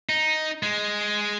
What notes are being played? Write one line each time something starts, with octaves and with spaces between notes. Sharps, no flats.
D#4
G#3